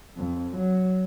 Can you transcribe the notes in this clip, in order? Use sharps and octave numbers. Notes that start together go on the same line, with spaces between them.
F2
F#3